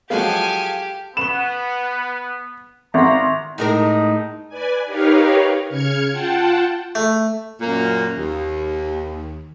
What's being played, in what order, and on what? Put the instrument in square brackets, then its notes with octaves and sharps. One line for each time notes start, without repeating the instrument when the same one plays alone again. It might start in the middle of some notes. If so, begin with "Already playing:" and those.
[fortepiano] F3 F#3 G#3 [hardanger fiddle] G4 [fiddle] A4 G#5 [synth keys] F5
[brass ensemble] B3 [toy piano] B5 C#6 [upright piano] E7
[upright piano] G#1 [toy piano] E5 F#5 [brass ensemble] A#5
[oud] A2 G#3 A#4 [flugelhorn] D#4
[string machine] B4 D5 G#5
D#4 G4 A#4 B4 C#5 F5
C#3 F6 G#6 C#7
F4 F#5 G5 A5
[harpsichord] A3
[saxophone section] F#2 A#2 A#3
D#2